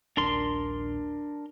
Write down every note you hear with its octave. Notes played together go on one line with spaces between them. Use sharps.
D#1 A#1 D4 A#4 C6